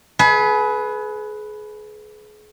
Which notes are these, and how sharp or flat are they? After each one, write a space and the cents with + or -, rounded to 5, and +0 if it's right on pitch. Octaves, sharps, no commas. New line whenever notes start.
G#4 +35 B4 +0